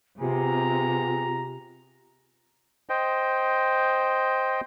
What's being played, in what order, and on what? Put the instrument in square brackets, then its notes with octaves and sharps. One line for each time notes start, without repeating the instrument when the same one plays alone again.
[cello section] C3 [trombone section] B3 G4 G#4 [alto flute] F4 [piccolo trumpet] A#5
[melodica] C5 D#5 G5